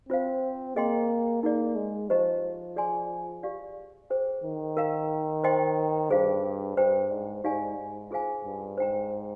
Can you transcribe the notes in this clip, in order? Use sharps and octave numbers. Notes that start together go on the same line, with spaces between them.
C4 F4 C5 F5
A#3 G#4 D#5 G5 C6
A#3 D#4 G#4 D5
G#3
F3 G4 C5 D#5 A#5
G#4 D5 G#5 C6
G4 D5 F5
G#4 C5 G5
D#3
A#4 F5 A#5
C5 D#5 G5 C6
G2 G#4 C5 F5
G2 C5 G5 A#5
G#2
G#2 D#4 G4 D5 F5 G#5
G#2
F4 G#4 C5 F5 G#5
G2
G#2 C5 G5 A#5